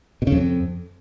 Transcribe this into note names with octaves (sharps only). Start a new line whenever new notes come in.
B2
C#3
F2